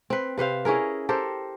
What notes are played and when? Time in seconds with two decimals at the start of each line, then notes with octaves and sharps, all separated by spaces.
0.10 C4 B4
0.38 C3 B4 C5 F5
0.65 C#4 E4 G#4 A#4
1.09 G4 A4 A#4 C5